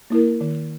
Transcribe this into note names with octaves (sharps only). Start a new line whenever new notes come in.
A#3 E4 A#4
D#3